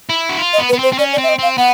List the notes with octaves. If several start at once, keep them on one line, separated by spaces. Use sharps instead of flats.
E4
F#4
F4
D#5
B3
B4
B3
C4 C5
C4
C#4 D5
D5
C4
E5
D#5
C4 F5
B3 F#5